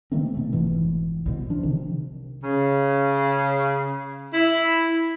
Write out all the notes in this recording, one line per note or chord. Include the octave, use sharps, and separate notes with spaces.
D#3 A3 A#3 C4
B2 A3
F1 G#2 B2 E3
C2 B2
F3 D4
C3 D#3
C#3
E4